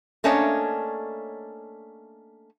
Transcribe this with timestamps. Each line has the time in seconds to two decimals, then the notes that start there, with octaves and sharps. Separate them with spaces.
0.24 A3 A#3 C#4 D4 C#5 D#5